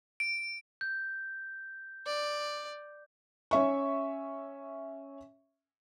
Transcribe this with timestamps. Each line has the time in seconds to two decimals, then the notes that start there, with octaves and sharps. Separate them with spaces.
0.20 D7
0.81 G6
2.07 D5
3.51 C#4 E5 C#6